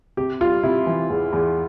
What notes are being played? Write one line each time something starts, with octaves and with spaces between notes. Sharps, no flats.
C3 G4
G3 F4
C3 E4
E3
E2
E2